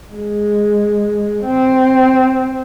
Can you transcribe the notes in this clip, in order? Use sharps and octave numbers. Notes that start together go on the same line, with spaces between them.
G#3
C4